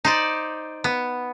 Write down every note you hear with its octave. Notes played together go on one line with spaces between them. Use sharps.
D#4 C5 D5
B3